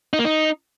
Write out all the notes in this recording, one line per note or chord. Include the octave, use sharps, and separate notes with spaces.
D#4
A#3
D#4